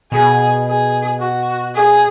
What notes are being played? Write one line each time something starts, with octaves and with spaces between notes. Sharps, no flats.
B2 G#4
G#4
F#4
G#4